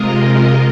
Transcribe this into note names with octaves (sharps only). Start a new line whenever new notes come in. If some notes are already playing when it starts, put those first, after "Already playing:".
Already playing: C3 G#3 F4 A#4 D#5